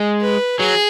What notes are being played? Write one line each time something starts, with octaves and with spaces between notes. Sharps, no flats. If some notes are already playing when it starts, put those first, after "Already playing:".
Already playing: G#3
B4
F#3 G#4